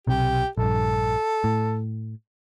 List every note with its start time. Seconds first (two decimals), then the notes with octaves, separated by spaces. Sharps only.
0.07 B1 C3 G4
0.57 A#1 G2 A4
1.44 A2